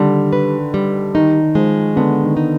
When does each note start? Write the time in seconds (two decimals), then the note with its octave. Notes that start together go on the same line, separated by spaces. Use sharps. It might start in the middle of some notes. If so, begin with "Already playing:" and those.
Already playing: D3 D#3 G3
0.33 B4
0.74 G3
1.15 D#3 D#4
1.55 F3 G#3
1.96 D3 B3
2.23 D#3
2.37 D#4